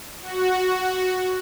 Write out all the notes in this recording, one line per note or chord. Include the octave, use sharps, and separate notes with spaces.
F#4